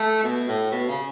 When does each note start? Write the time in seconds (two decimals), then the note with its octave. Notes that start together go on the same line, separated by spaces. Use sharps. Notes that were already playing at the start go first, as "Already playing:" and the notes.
Already playing: A3
0.24 B2
0.48 A2
0.72 B2
0.88 C#3